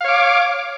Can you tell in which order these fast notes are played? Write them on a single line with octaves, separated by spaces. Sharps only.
F5 C#5 D6